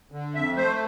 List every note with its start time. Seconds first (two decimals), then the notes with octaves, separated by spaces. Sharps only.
0.12 D3
0.35 F2 E5
0.57 A3 C5